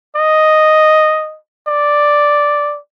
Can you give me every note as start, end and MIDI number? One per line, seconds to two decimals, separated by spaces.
0.16 1.37 75
1.68 2.79 74